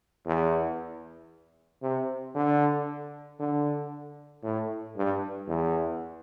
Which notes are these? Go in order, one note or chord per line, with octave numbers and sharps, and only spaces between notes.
E2
C3
D3
D3
A2
G2
E2